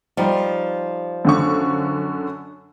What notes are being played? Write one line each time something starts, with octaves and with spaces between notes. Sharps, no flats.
F3 G3 D#4
F#2 D3 C#6